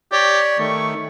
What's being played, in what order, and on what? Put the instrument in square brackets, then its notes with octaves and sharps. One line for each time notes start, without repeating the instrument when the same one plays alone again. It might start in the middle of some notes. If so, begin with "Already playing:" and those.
[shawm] G4 [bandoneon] C#5 D5
[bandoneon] D#3 A3 [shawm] C#6